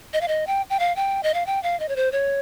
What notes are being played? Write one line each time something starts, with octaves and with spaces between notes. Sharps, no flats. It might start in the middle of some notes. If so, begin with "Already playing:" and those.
D#5
F5
D#5
G5
G5
F5
G5
D#5
F5
G5
F5
D#5
C#5
C5
C#5